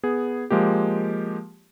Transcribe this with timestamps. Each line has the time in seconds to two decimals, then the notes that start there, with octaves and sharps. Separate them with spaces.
0.03 B3 G#4
0.50 F3 G#3 A#3 G4